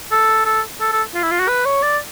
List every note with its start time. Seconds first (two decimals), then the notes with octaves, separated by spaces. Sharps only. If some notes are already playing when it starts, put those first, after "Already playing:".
0.12 A4
0.45 A4
0.81 A4
0.92 A4
1.14 F4
1.23 E4
1.31 F4
1.40 F#4
1.48 B4
1.66 C#5
1.83 D5